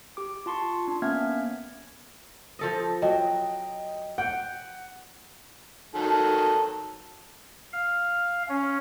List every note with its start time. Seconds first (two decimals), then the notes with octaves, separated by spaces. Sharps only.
0.17 G4 D6
0.46 F4 A5 C6 C#6
0.88 D4
1.02 A#3 B3 C#4 E5 F6 G#6
2.59 F3 A4 D#5
3.02 F#3 D#5 G5
4.18 F#5 G5
5.95 D#3 F#3 A4
7.73 F5
8.49 C#4